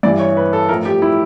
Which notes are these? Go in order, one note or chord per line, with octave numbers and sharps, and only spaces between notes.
G2 E3 G3 D5
C#5
B4
A4
A2 F3 A#4
G4
E4